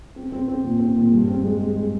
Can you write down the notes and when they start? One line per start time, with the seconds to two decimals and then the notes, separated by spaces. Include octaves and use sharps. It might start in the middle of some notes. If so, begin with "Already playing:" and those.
0.16 C4
0.32 C4
0.48 C4
0.64 A#2
0.80 C4
0.96 A#2
1.12 G2
1.28 C4
1.44 G#3
1.60 G#3
1.76 G#3